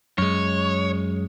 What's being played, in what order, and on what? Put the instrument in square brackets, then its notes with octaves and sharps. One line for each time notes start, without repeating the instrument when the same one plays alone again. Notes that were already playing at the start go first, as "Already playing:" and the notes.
[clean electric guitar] F#2 G#3 [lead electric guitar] C#5